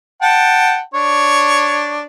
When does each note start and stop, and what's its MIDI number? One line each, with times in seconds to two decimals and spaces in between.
0.22 0.80 78
0.22 0.80 79
0.22 0.80 81
0.94 2.05 62
0.94 2.05 73